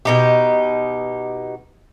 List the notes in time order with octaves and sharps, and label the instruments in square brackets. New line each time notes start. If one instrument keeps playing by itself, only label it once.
[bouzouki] B2 D#4 G4